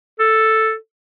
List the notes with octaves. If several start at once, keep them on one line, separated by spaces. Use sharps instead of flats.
A4